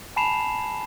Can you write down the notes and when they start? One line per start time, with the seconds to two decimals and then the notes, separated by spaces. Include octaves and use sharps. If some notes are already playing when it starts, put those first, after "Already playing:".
0.16 G#5 A5 B5 C7 E7 F7